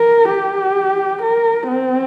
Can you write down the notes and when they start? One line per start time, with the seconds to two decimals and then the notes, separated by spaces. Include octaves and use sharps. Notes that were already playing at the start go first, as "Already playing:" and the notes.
Already playing: A#4
0.30 G4
1.22 A#4
1.68 C4